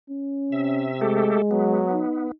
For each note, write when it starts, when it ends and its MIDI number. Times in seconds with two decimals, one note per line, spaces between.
0.10 0.90 61
0.52 1.37 48
0.52 1.01 76
1.01 1.86 56
1.01 1.42 57
1.01 1.42 67
1.01 1.42 69
1.51 2.04 54
1.51 2.31 59
1.92 2.31 63